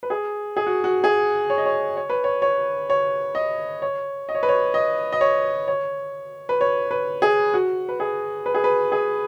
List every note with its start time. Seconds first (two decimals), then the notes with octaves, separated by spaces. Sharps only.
0.03 B4
0.10 G#4
0.57 G#4
0.67 F#4
0.84 F#4
1.04 G#4
1.50 C#5
1.58 D#5
1.66 C#5
1.97 C#5
2.10 B4
2.24 C#5
2.42 C#5
2.90 C#5
3.35 D#5
3.82 C#5
4.29 D#5
4.35 C#5
4.43 B4
4.49 C#5
4.74 D#5
5.12 D#5
5.21 C#5
5.68 C#5
6.49 B4
6.61 C#5
6.91 B4
7.22 G#4
7.54 F#4
7.89 B4
8.00 G#4
8.46 B4
8.55 G#4
8.64 B4
8.92 G#4